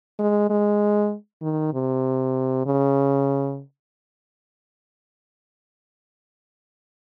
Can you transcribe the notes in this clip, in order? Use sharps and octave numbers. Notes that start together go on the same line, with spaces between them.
G#3
G#3
D#3
C3
C#3